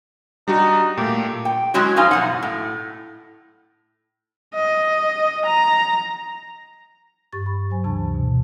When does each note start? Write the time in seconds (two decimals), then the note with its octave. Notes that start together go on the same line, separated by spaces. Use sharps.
0.48 G3 D4 D#4 F#4
0.97 A#2 A3 G4
1.45 G5
1.74 F#3 G#3 C#4 E4 F#4
1.96 F2 C#4 D#4 F4 G#5
2.11 F#2 B2 F#5
2.43 A2
4.55 D#5
5.46 A#5
7.33 G2 G4 C#6 A6
7.46 B5
7.70 F#3 C5 G#5
7.84 D2 C3 E3 D4 A5
8.14 B2